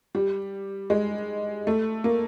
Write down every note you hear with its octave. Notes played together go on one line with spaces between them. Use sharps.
G3
G#3
A3
A#3